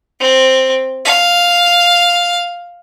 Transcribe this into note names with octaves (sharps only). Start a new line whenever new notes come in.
C4
F5